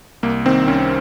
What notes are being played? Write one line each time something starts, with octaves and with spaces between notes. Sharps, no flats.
C2 A#3
D#3 C4
C2 C#4